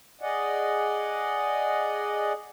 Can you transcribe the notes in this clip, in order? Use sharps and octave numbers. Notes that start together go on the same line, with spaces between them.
G#4 D5 D#5 F#5